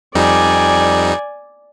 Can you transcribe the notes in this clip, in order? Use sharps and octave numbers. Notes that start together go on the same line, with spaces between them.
F2 G3 D#4 D5 G#5